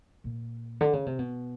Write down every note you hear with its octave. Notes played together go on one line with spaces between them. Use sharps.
A#2
D3
C#3
C3
B2